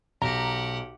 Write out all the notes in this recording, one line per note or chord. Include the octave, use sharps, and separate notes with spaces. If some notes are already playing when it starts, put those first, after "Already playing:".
B1 G4 F#5 A#5